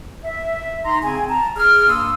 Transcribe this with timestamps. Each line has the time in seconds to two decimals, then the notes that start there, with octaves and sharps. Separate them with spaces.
0.24 E5
0.85 D#4 A#5 C6
1.03 C#3 C4 G#5
1.29 A5 A#5
1.56 G#4 F6
1.87 G2 A#3 C6 D#6 E6